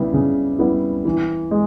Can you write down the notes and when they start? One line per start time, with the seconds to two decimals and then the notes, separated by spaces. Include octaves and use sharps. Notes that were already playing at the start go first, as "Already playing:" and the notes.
Already playing: C#3 G3 B3 E4
0.13 C#3
0.59 G3 B3 E4
1.05 E3
1.51 G#3